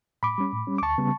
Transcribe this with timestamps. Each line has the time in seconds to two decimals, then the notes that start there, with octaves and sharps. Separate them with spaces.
0.23 A2 B5 D6
0.38 G3 C#4
0.52 A2
0.67 G3 C#4
0.78 D6
0.82 D2 A5 C#6
0.98 C#3 G3 B3